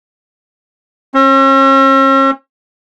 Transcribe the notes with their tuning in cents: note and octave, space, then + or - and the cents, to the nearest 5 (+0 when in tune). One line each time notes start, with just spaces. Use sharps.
C#4 -45